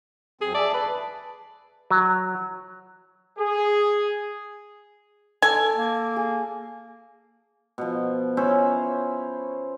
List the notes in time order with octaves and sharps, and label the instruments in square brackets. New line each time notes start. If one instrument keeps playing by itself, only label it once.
[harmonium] F#2 C4 [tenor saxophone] G#4
[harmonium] G#4 E5 A5 [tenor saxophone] D5
[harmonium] E2 A4 [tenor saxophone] B4
[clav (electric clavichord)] F#3
[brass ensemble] G#4
[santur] A4 D5 A5 [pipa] G#5
[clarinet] A#3
[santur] G#4
[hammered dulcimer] B2 F3
C#4 E4 C5 C#5